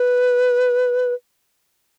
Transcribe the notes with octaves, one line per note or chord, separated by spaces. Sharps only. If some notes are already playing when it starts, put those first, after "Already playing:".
Already playing: B4